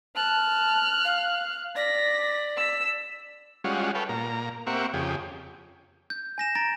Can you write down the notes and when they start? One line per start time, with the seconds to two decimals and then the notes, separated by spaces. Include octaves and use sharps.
0.16 A5 F6 F#6
1.05 F5
1.76 D5 A#6 B6
2.57 E6 B6
3.64 G3 G#3 C#4 F4 F#4
3.95 A4 B4 C#5 F5 G5
4.09 A#2 A#5
4.67 A#3 C4 G4 E5 F#5 C#6
4.94 F2 C#3 G4 G#4
6.10 G6
6.38 G#5 A#6 E7
6.55 A#5 A6 A#6 D7